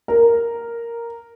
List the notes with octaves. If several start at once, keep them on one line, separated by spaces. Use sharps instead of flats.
A#4